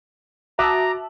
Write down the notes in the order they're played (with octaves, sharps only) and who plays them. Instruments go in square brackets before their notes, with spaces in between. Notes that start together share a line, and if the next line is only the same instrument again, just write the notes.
[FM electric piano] F#4 [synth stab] E5 A5 [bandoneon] A#5 [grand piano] D6 D#6 F#6